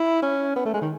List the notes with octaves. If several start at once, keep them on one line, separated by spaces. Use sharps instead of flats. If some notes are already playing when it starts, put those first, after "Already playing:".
Already playing: E4
C#4
B3
A3
G#3
D#3